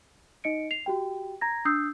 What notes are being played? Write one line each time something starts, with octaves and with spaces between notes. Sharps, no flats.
D#4 D#5 C#7 D7
C7 F7
F#4 G4 G5
A#5 G#6 A#6
D4 D#6 E6 G6 C7